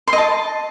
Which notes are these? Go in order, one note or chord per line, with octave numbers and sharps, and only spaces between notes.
C6
D#5
A5